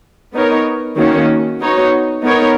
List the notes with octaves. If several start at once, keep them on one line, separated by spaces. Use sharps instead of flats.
B3 D#4 A#4 C#5
D#3 A#3 C#4 F#4 C#5
B3 D#4 F#4 C#5
B3 D#4 A#4 C#5